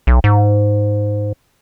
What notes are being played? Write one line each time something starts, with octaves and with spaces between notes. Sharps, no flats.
B1
G#2